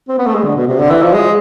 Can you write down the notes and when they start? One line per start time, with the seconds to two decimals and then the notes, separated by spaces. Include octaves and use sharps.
0.09 C4
0.18 B3
0.27 A3
0.35 G#3
0.44 D3
0.56 B2
0.68 C3
0.79 D3
0.91 E3
1.03 F3
1.14 G#3